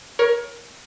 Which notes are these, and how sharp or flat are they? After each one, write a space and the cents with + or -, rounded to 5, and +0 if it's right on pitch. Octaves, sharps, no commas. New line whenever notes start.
A#4 +25 C#5 +5